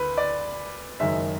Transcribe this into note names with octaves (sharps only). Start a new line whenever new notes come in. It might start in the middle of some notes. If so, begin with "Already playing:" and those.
Already playing: D2 B4
D5
F#1 F#2 D#3 G#3 E5